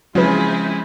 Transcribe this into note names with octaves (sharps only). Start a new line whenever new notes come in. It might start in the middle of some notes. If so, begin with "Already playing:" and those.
C#3 F3 F#3 G#3 C4 E4 G#4 B4